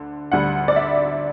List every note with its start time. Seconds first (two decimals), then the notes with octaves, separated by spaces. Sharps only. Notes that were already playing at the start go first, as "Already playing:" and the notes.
Already playing: D2 D3
0.32 D2 D3 G3 F#5
0.68 D5
0.76 E5